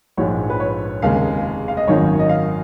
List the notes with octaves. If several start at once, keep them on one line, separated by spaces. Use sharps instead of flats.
A#1 G#2 F3 G#3 C#5
B4
C#5
F1 D#2 C#3 G#3 F5
F5
D#5
G#1 F#2 D#3 C#5
D#5
F5